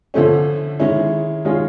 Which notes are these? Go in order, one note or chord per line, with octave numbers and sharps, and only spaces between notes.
D3 F3 A3 C#4
D#3 G#3 C#4 E4
D#3 G#3 C#4 F4 G#4